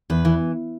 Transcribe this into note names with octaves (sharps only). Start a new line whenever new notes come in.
E2 B4
E3